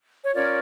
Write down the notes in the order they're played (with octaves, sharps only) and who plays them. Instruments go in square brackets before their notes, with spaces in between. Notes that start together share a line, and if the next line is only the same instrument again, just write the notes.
[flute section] C#5
C#4 F4 A#4 C#5 D5